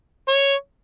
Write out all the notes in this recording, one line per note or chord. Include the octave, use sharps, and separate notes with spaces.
C#5